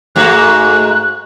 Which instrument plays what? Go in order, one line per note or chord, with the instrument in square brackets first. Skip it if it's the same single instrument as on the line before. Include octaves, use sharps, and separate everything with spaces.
[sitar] G#2 A3 F#4 [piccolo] F#6